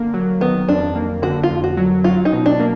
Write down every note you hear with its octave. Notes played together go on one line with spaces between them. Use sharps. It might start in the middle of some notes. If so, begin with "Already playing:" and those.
Already playing: D3 A#3
F#3
D#3 B3
F2 D4
A#3
D3 F#4
F4
F2
F#4
F#3
F#3 F4
D#4
B2
D4
A#3